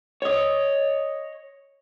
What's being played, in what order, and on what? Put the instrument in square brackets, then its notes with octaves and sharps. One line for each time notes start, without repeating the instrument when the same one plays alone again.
[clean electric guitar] C#5 D#5